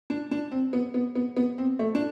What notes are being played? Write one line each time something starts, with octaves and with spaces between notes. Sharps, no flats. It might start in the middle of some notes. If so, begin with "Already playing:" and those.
D4
D4
C4
B3
B3
B3
B3
C4
A3
D4